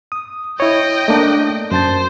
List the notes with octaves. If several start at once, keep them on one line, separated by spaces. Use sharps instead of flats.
D#6
E4 C#5 D#5 G5
A3 A#3 D4
F#2 C5 A5 A6